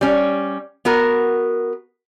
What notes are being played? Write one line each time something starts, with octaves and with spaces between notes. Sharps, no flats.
G3 C#4
B3 F#4 A#4